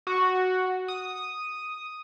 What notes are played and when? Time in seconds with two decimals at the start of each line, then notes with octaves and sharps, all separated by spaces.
0.07 F#4
0.88 D#6